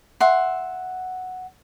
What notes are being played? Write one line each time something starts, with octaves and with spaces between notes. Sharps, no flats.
E5 F#5 C6